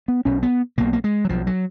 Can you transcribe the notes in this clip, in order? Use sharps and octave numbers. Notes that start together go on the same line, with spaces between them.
B3
B1 B2 C#4
B3
B1 B2 A#3
A#3
G#3
F#3
B1 B2 F3
F#3